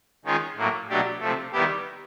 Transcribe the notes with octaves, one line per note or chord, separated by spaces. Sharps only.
D#3 G#3 C#4 F4 G#4
A2 F#3 A#3
B2 F#3 A3 D4 G4
C3 F3 A3
D#3 G3 B3 E4 G4